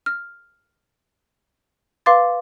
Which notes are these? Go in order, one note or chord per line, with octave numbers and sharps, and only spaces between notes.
F6
B4 F5 C6 D6 A6